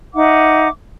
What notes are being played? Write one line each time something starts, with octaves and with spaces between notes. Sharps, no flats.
D#4 E5 F#5 D6